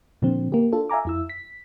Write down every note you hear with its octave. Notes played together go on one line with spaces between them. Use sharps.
A#2 D3 F3 C4
A#3 G4
D4 F4 A4
E5 F5 G#5 A#5 D6
F2 E4 E6
B6